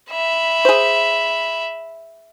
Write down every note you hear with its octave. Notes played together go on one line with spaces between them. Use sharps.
E5 B5
G#4 C5